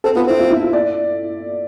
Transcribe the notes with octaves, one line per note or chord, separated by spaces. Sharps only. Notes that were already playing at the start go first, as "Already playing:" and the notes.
C4 A4
B3 F4
C4 E4
F4
E4
F4
D5